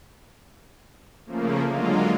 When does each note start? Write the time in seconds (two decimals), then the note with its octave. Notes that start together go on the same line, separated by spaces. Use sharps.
1.26 C#3 F3 A3 A#3
1.66 D3 F#3 G#3 A#3 F4